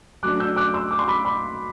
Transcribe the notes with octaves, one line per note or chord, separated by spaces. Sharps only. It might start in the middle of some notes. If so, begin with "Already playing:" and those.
F#3 A3 D4 D6 F#6
E6 G6
D6 F#6
C6 E6
D6
C6
B5 D6
B5 D6